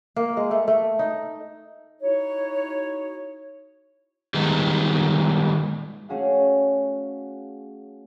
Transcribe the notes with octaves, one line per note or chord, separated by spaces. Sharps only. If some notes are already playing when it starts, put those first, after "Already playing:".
A#3
G#3
A3
A3
D#4
D#4 E4 F#4 C#5
D#3 G3 G#3 B3 D#4
A3 C#4 F#4 G#4 F5 F#5